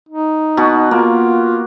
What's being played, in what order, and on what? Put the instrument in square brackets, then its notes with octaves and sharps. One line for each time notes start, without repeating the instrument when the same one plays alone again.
[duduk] D#4
[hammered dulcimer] B2 F#4
[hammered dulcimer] A#3 [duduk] F4